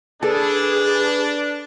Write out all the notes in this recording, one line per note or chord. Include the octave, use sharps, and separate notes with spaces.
D4 G#4 A4 B4